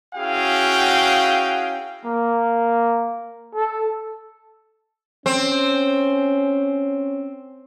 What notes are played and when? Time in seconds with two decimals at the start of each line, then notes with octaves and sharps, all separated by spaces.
0.15 C#4 E4 F#4 G#4 F5 G5
2.05 A#3
3.55 A4
5.26 C4 C#4